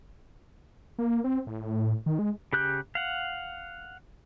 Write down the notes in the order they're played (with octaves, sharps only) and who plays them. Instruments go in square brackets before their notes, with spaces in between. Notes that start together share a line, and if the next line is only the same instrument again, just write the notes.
[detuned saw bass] A#3
C4
A2
D#3
G#3
[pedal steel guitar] C#3 G4 F#6 G6
F5 F#5